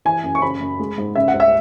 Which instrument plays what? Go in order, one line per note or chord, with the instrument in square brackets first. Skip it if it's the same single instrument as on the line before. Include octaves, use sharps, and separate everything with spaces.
[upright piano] E3 G#5
F#2
C#6
C#3 B5
F#2
G#3
G#2
C#3 E5
F#5
C#2
E5